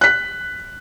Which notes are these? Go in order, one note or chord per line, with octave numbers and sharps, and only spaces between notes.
F#6 B6